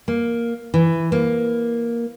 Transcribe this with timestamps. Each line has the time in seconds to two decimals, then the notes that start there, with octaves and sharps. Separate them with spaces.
0.08 A#3
0.74 E3
1.12 A#3